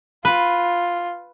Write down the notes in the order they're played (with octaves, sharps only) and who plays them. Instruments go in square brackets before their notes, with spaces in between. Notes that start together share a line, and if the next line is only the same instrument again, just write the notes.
[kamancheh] F4 [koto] B4